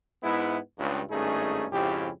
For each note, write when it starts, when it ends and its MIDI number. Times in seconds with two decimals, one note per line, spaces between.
0.23 0.57 44
0.23 0.57 56
0.23 0.57 59
0.23 0.57 64
0.79 1.00 37
0.79 1.00 43
1.11 1.66 32
1.11 1.66 43
1.11 1.66 57
1.11 1.66 61
1.11 1.66 63
1.11 1.66 68
1.72 2.08 41
1.72 2.08 44
1.72 2.08 49
1.72 2.08 64
1.72 2.08 67